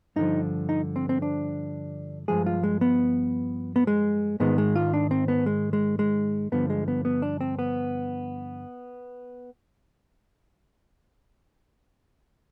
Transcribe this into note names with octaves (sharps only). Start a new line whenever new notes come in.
G2 D3 F3 D#4
D#4
C4
C4
D4
G2 F3 G#3 G#4
F4
G#3
B3
B3
G#3
G#2 D#3 G#3 B3
G#3
F4
D4
C4
B3
G#3
G#3
G#3
G2 D3 F3 B3
G#3
B3
B3
D4
C4
B3